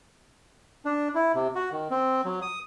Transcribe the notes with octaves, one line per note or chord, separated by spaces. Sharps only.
D4
E4
C3
F#4
D#3
C4
F#3
D#6